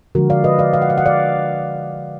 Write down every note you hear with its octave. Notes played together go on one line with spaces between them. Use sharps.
D3 F3 G#3 F#4 A#4
D5 F5
B4 D#5
D5 F5
F5
F#5
F5
F#5
D5 F5